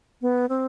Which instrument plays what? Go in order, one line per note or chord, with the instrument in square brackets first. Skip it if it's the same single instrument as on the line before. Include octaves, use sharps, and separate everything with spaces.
[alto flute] B3
C4